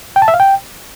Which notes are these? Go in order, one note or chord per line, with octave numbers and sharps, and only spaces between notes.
G5
A5
E5
F5
G5